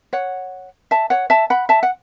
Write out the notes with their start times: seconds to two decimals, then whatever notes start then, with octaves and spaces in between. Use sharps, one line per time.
0.13 C#5 F#5
0.91 E5 A5
1.10 C#5 F#5
1.30 E5 A5
1.50 F#5 B5
1.69 E5 A5
1.83 F#5